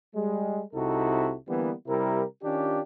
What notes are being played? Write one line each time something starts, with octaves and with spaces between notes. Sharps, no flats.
G3 G#3
C2 C3 D#4 E4 F#4 A4
D3 E3 G3 A#3 B3
C3 G3 E4 A#4
D#3 C#4 D4 F4 G4